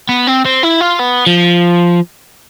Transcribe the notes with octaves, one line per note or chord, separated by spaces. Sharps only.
B3
C4
C4
E4
F4
B3
F3